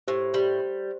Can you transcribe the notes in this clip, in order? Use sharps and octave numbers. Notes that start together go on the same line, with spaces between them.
A2 G4 C5
G3